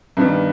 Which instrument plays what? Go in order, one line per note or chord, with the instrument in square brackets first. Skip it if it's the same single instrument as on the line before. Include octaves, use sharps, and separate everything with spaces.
[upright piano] G2 D#3 G3 B3